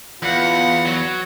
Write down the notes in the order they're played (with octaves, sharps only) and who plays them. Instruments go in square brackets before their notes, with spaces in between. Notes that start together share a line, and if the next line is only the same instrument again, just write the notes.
[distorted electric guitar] E2 [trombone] F4 [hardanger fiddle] B4 F#5
[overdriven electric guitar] F#3